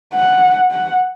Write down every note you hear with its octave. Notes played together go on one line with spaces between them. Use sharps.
F#5
F#5